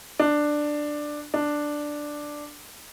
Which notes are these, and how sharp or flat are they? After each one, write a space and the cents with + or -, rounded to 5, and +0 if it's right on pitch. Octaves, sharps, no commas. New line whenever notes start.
D4 +10
D4 +5